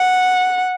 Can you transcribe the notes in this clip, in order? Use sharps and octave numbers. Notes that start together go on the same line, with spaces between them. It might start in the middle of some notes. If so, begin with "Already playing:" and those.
Already playing: F#5